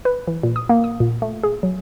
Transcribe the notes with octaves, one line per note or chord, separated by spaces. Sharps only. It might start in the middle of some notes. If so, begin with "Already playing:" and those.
B4
E3
A#2
D#6
A#3
D#6
A#2
A3
G#4
F#3